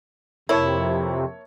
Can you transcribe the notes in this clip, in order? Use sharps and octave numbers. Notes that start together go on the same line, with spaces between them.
F2 C3 A#3 E4 C#5 A5